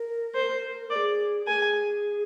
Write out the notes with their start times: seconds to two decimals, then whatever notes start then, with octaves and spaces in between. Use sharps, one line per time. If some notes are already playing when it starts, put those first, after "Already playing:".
Already playing: A#4
0.35 C5
0.90 A#4 D5
0.95 G#4
1.47 G#4 A#4 G#5